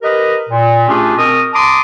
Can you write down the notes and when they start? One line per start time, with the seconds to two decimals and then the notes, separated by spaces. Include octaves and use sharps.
0.03 G4 A#4 B4 D#5
0.50 A#2
0.87 A3 C#4 D4 F4 G4 G#4
1.17 B2 C4 A#4 D#6
1.53 A5 A#5 C6 D6 D#6